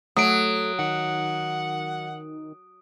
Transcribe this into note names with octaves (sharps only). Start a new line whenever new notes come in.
F#3 A3 D#6 D7
D#3 F#5